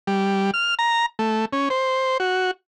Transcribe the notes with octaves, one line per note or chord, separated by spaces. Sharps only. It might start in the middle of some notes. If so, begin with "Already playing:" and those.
G3
F6
A#5
A3
C#4
C5
F#4